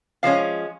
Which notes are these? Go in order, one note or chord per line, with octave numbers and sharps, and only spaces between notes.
F3 G#3 C#4 F5